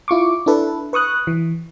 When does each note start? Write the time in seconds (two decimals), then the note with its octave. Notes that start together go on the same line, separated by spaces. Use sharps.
0.08 E4 F4 C#6 D6
0.46 D4 E4 A4 B4
0.93 B4 C#6 D#6 F#6
1.27 E3